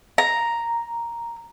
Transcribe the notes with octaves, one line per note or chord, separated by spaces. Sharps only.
A#5